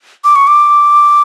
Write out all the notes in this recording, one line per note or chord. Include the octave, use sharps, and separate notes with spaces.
D6
C#6
D6